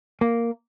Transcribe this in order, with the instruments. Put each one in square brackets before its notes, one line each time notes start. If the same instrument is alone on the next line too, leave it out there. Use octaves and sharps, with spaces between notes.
[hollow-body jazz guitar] A#3